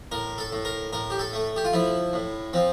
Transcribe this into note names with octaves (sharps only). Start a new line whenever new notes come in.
A2 A#4
A4
A2
A#4
A2 A#4
G4
A4
A3
G4
F4
F3 E4
A2
F3 C4